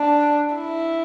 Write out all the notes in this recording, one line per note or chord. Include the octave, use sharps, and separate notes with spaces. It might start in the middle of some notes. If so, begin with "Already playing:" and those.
Already playing: D4
E4